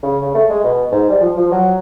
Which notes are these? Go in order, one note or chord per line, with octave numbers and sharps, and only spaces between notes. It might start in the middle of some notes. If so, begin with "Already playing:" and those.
C#3
C#3
A3
G#3
B2
G#2
G3
F3
F3
F#3